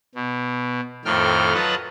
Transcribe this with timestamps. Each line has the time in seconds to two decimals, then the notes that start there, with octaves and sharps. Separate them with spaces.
0.15 B2
1.05 F2 A2 D#3 G5 F6
1.54 F#3 F4 B4 D#5 F#5 A5